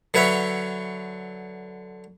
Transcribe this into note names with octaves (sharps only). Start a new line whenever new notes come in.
D3 F#3 B4 C#5 E5